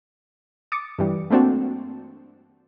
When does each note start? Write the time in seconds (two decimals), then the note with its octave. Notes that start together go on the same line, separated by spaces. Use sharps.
0.72 D6 D#6 A6 C#7
0.99 G2 E3 G3
1.30 A3 A#3 C4 D4 F#4